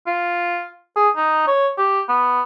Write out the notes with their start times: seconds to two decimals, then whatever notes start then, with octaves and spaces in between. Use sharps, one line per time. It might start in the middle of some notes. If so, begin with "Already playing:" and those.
0.07 F4
0.96 G#4
1.16 D#4
1.47 C#5
1.78 G4
2.08 B3